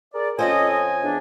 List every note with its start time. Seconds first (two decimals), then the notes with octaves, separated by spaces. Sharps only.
0.14 G#4 A#4 D5
0.39 F2 C#4 F4 A4 C5 D#5 G#5
1.03 E2 D4